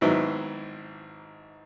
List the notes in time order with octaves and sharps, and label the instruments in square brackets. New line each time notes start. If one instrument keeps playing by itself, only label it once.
[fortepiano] G#1 G#2 F#3 B3 E4